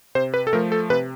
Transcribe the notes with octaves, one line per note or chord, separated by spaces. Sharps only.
C3 C5
B4
A4
F3 A3 A#4
A4
C3 B4